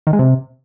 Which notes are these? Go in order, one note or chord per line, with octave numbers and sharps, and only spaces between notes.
D#3
G#3
C3